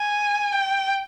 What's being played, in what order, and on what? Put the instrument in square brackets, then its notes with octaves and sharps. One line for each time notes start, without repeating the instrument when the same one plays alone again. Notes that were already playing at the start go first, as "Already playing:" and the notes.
Already playing: [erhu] G#5
G5